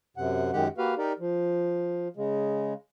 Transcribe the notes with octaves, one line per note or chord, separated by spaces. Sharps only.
F#2 C3 F#5
F#2 D#3 G#3 G4 F#5
A#3 F#4 G4 B4 F5
D#4 G4 A#4 D5
F3
C#3 G#3